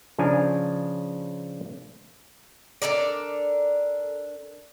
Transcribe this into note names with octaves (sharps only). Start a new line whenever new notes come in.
C#3 F3 D4 G#5 A#5
D4 A4 A#4 D5